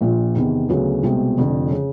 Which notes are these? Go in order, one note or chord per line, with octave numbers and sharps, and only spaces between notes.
A#1 A#2 F3
E2 C3 D#3
D2 C#3 F#3 B3
C2 B2 G#3 C4
F1 F2 D3
C#3